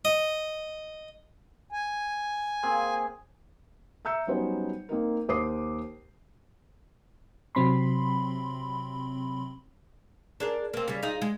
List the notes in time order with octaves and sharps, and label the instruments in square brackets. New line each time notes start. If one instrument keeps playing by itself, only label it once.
[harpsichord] D#5
[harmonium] G#5
[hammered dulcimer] A#3 C4 G#4
[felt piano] E5 A#5 E6 G6 C#7
F#3 G3 B3 C#4 D#4 C5
A#3 C4 D#4 A#4
D#2 C5 D6 D#6 C7
[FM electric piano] C3 F#3 C4 B5 C6
[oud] D4 G#4 A#4
A#3 C4
C#3 G3
D#4 F4 G#4
G#3